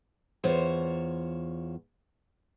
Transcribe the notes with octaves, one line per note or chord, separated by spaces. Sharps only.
E2 F4 C5 C#5